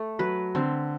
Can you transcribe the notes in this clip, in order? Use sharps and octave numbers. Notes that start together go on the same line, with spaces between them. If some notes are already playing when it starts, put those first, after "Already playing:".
Already playing: A3
F#3 B4
D3 C4